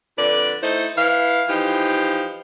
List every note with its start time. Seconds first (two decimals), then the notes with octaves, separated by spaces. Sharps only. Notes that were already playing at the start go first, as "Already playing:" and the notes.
0.17 F2 D3 B4 D5
0.62 A3 D#4 E4 C5
0.97 E3 F5
1.49 E3 F3 D#4 G4